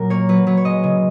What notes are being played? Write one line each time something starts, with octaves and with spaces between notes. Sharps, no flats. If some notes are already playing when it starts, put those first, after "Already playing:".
Already playing: A#2 F#3 A#4
A#3 C#5
F#3 B4
F#3 B4
C#5
G#3 D#5
C#3